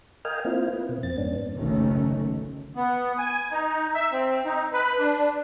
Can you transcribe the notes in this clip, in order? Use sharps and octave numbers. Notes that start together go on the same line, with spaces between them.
A#4 D#5 F5 G5 G#5 F6
A#3 C4 E4 F4
B4
B2 C4
F2 C4 A6
F2 G#2 B3 C#4 D4
F#1 B1 D3 D#3 A3 C#4
B3
G#5
D#4
E5
C4
D#4
B4
D4